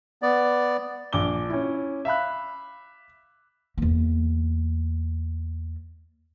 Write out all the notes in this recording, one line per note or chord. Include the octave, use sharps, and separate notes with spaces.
B3 D5
A#1 D4 D6 G7
C#4 E4
E5 F5 B5 F#6
E2 A#3